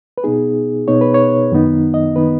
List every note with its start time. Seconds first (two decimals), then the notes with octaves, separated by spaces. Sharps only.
0.18 B4
0.24 B2 B3 D#4 G#4
0.88 B2 B3 D#4 C#5
1.01 B4
1.14 C#5
1.52 F#2 D#3 B3 D#4
1.94 D#5
2.16 D#3 B3 D#4 B4